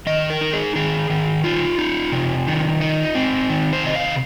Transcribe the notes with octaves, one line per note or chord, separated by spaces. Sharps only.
D#3 D#5
A#4
D#4
G#4
D#3 G#4
D#3
D#4 F4
D#4
C3
D#3
D#4
C4
D#3
C5
C3 D#5
F5